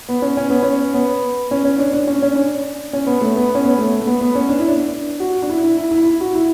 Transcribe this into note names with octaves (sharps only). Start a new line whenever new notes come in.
B3
C#4
C#4
B3
C#4
B3
C#4
C#4
D4
D4
C#4
C#4
D4
C#4
B3
A3
B3
C#4
B3
A3
A3
B3
B3
C#4
D4
E4
D4
F#4
D4
E4
E4
E4
E4
E4
F#4
E4